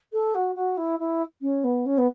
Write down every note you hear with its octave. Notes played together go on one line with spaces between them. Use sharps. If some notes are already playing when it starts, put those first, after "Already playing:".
A4
F#4
F#4
E4
E4
C#4
B3
C#4
B3